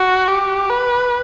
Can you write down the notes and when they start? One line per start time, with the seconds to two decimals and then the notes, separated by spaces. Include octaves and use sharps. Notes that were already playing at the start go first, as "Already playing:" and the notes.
Already playing: F#4
0.28 G4
0.69 B4